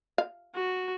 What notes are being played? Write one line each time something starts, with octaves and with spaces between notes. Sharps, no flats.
F5
F#4